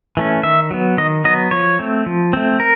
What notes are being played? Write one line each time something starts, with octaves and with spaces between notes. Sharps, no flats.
E3 A3 C#4
D#3 E5
F#3 B3
D#3 D#5
F#3 B3 D#5
F3 C#5
A3 C4
F3
A3 C4
A#4